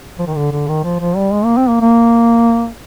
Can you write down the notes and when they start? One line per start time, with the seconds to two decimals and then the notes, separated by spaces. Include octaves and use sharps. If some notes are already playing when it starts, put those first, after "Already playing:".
0.19 F3
0.27 D#3
0.36 D3
0.52 D3
0.68 D#3
0.84 F3
1.00 F3
1.16 G3
1.33 G#3
1.45 A#3
1.57 C4
1.69 A#3
1.81 A#3